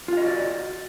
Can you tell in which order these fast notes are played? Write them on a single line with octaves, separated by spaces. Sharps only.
F4 F5 D#5 F#4 D5